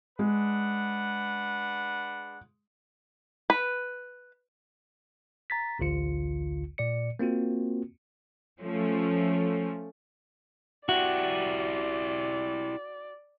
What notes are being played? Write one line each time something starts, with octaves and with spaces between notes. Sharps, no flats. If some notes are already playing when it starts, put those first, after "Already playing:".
G#3 D4 B4 F#5
B4
A#5 A6 B6
A1 D2 D3 F4 C#7
A#2 D5 C#7
A#3 C4 F4 F#4
F3 A3 C#4
E4 F#4 G4 D5